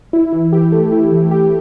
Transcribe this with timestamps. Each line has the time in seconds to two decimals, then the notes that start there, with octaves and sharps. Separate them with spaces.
0.13 E4
0.33 E3
0.53 G4
0.72 A3
0.92 E4
1.12 E3
1.31 G4